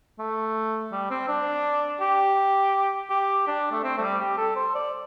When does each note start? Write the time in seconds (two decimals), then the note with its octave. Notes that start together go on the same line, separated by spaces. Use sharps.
0.19 A3
0.92 G3
1.10 C4
1.28 D4
2.01 G4
3.10 G4
3.47 D4
3.72 A3
3.83 C4
3.98 A3
4.01 G3
4.20 G4
4.38 A4
4.56 C5
4.75 D5